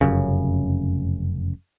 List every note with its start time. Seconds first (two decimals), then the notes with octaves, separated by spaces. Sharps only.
0.01 F1 F#2 C#3